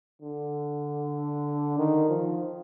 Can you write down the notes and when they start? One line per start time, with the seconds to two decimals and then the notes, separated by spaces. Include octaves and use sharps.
0.22 D3
1.78 D#3
2.09 F3